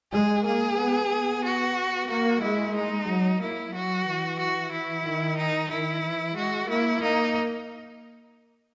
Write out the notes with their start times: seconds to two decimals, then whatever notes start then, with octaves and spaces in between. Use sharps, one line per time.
0.13 G#3 G#4
0.46 A#3 G#4
0.78 B3
1.11 B3
1.45 F#4
2.10 A#3 F#4
2.42 G#3 E4
2.76 D#4
3.08 F#3
3.41 A#3 E4
3.74 F#3 F#4
4.07 E3
4.39 F#4
4.72 E4
5.05 D#3
5.38 D#4
5.71 D#3 E4
6.04 E3
6.36 G#3 F#4
6.70 A#3 E4
7.02 A#3 D#4